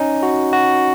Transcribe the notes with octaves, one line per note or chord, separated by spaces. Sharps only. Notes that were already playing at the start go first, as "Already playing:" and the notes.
Already playing: C#4 D#4
F#4
F#4